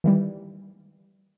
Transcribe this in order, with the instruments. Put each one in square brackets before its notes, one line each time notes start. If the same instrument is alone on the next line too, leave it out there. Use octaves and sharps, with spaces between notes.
[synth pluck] D#3 E3 G3